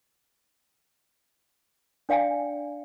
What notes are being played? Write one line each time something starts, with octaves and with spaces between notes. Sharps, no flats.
D4 D5 F5 G5 G#5